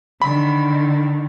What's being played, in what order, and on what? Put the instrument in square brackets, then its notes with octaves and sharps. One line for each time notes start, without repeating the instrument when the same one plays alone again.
[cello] D3 D#3 [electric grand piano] B5